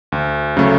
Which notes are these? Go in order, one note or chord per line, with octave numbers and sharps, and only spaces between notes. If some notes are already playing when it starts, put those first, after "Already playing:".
D2
C#3 F#3 A3